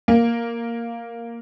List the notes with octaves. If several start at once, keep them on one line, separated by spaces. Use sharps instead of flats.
A#3